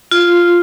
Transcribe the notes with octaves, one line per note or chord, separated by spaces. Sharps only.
F4